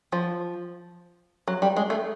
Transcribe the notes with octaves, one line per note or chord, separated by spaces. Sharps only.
F3
F#3
G3
G#3
A3